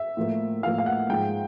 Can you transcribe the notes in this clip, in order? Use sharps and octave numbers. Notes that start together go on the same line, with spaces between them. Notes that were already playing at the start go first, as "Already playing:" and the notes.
Already playing: E5
A2 F3 A#3
A2 F3 A#3 F5
F5
F#5
G#2 F3 G#3 G5